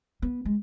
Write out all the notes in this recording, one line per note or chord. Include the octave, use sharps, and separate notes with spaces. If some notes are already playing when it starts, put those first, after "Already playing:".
B3
G#3